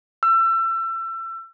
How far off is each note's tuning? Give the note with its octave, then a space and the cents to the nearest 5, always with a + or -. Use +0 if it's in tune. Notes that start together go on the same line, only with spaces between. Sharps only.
E6 +30